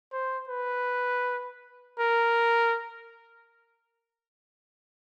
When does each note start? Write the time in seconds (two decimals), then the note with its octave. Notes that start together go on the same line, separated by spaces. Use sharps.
0.12 C5
0.49 B4
1.99 A#4